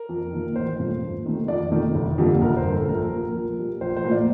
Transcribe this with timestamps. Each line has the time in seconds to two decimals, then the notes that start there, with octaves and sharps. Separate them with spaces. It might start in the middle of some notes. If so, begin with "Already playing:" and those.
Already playing: A#4
0.09 F2
0.33 D#3 A#3
0.55 A1 C5
0.79 G2 F3 A3
1.02 D#2
1.26 D#3 A3
1.48 F2 D5
1.72 D#3 A3
1.95 G1
2.18 F2 D3 G3 A#3
2.42 G1 A#4
2.57 C5
2.64 G2 D3
2.72 A4
2.88 A#1 A#4
3.11 A#2 F3 A#3
3.34 A#1
3.58 A#2 G3 A#3
3.81 A#1 C5
3.97 C5
4.04 A2 F3 A#3
4.12 D5